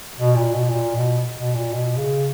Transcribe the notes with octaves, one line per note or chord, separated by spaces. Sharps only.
B2
A#2
B2
A#2
B2
B2
A#2
B2
C#3